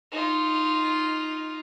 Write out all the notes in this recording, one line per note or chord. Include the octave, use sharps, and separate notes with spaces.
D#4 F4